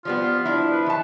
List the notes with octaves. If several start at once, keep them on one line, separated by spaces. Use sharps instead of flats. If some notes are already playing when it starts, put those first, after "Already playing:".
F3 G3 B3 F4
F3 D4 E4
B4
D#3 A5